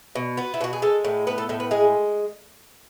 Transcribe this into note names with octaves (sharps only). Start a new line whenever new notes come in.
B2
B3 F#4
E4
B2 F#4
G#4
G#3 A4
A2
B3 B4
A4
A2 A4
B4
G#3 G#4